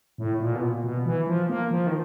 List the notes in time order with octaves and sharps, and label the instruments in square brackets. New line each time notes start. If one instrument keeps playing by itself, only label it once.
[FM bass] A2
A#2
B2
A#2
B2
E3
F3
A#3
F3
D#3